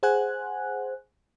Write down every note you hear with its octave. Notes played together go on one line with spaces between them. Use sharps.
G#4 C5 F#5 G#5 F#6